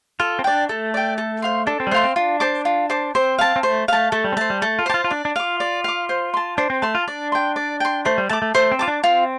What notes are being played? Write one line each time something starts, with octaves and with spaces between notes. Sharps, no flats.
F4 A4
C4
D4 D5 G5
A3 A4
D5 G5
A4
C5 F5 C6
D4 A4
C4
G3
A3 C5 F5 C6
C4
D4 F4
C5 A5 D6
F4
C5 A5 D6
C4 C5
F5 A5
C4
A3 C5
A3 F5 A5
A3 A4
G3
C4
A3 C5 A5
G3
A3 A4
F4
G4 C5 A5
F4
F4
D4 D5
D4
F4 F5 D6
D5
F5 D6
C5
A5 C6
D4 C5
C4
A3 A5 C6
F4
D4 D5
G5 C6
D5
G5 C6
A3 C5
G3
A3 A5 D6
A3
A3 C5
C4
F4 A5 D6
D4
C4 F4